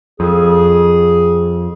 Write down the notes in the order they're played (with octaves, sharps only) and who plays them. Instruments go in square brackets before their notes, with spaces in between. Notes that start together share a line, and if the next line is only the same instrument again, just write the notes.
[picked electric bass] F2 [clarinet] G#4